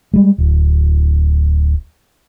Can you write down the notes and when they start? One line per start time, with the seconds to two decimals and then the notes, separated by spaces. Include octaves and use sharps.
0.14 G3 G#3
0.38 D1